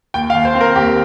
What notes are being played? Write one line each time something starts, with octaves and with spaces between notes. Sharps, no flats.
D#2 G5
F5
D#2
C5
C4
A#4
D#2 G4